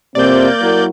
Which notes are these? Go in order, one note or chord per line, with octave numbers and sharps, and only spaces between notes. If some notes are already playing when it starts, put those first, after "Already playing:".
F2 C3 A#3 C4 D5 G6
F#3 E4 F#4 A#4